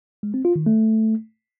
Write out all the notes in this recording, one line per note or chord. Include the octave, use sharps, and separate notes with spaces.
G#3
C4
F4
D#3
A3